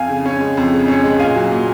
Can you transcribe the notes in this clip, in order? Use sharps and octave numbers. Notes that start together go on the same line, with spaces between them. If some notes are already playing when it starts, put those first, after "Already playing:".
Already playing: F2 F5 G#5
C#3
C#4
G#3
F2
C#3
C#4
G#3
A#2 F5 G#5
F#3
A#2